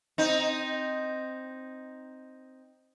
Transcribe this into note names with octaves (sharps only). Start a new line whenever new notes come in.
C4 D#4